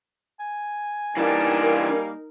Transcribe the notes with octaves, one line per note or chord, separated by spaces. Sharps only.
G#5
E3 G3 A#3 D4 D#4 A#4